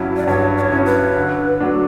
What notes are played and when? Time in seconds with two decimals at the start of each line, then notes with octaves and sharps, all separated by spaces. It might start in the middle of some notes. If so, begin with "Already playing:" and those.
Already playing: G2 F#3 C#4 E4
0.17 D5
0.27 G2 C#5
0.57 D5
0.61 C#5
0.72 F#3 C#4 E4
0.86 B4
1.16 D3
1.60 F#3 A3 D4